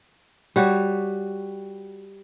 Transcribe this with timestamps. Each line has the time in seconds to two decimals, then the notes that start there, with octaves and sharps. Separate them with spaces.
0.56 G3 F#4 C#5